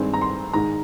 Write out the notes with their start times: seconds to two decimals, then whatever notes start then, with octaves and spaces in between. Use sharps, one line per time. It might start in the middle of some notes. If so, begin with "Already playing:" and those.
Already playing: G2 D#3 G#3 C4
0.14 A#5
0.21 C6
0.53 G#2 D#3 G#3 A#5